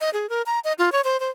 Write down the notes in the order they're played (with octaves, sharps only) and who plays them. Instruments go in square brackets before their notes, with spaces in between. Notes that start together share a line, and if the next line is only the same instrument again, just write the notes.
[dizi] D#5
G#4
A#4
A#5
D#5
F4
C#5
C5
C5